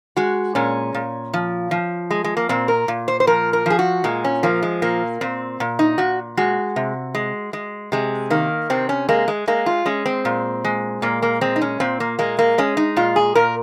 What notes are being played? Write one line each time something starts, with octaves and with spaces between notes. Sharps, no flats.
G#3 F#4
A#2 C#4
A#2
F3
F3
G#3
G#3
A#3
A#2 C4
A#4
A#2
C5
C5
F3 A#4
A#4
F3 G#4
F#4
A#2 G#3
C#4
F3 A#3
G#3
A#2 A#3
A#2 C4
A#2
D#4
A#2 F#4
G#3 F#4
C3
G#3
G#3
C3 G#3
D#3 A#3
C3 C4
C#4
G#3 A#3
G#3
G#3 A#3
F4
G#3 C#4
C4
A#2
G#3
A#2 A#3
A#3
G#3 C4
D#4
C#4
A#2 C4
A#3
G#3 A#3
A#3
G#3 C#4
D#4
A#2 F4
G#4
A#2 A#4